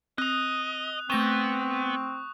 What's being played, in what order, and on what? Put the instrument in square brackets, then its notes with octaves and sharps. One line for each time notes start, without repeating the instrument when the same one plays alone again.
[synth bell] C4 [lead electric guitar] D#5 [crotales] D#6 F#6
[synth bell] A3 A#6 G7 [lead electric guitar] B3 [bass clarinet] C4 [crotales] C#6